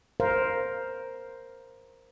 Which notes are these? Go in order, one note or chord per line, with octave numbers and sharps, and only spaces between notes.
A#4 C5 F5